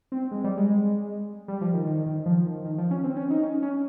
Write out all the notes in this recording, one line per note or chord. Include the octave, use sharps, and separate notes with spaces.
C4
G#3
G3
G#3
G3
F3
D#3
D#3
D#3
F3
D#3
D#3
F3
C#4
C4
C#4
D#4
C#4
C#4